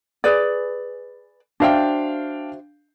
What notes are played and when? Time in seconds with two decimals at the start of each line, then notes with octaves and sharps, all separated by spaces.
0.24 G#4 B4 D5
1.60 D4 F#4 C5 E5 F5 G5